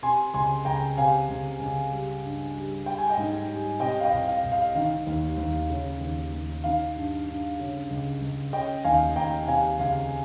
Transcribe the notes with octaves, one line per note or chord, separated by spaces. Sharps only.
C3 G#5 C6
C#2 G#5 C6
C#2 G5 A#5
C3 F5 G#5
C#2
C#2
G3
G2
G3
G3 G5
G#5
D#5 G5
G#2
G3
C3 D#5 G5
F5
D#5 G5
C2
F5
C2
F5
D#3 F5
D#2
D#2
C#3
D#2
D#2
D#3 F5
G2
G2
C#3
C#2
C#2
C#3 D#5 G5
D#2 F5 G#5
D#2 G5 A#5
C3 F5 G#5
C#2 F5